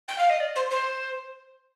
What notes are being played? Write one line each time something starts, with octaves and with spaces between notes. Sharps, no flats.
G5
F5
D#5
D5
C5
C5